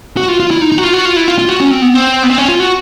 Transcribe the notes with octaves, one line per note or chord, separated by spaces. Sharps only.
F#4
F4
F4
E4
D#4
D#4
F#4
F4
F#4
F4
E4
F4
F4
F#4
C#4
C4
B3
C4
B3
C4
C#4
F4
F#4